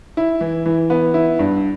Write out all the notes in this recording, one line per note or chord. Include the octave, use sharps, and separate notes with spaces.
E4
E3
E3
B3
E4
G2